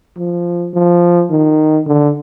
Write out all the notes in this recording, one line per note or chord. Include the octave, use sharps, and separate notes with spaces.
F3
F3
D#3
D3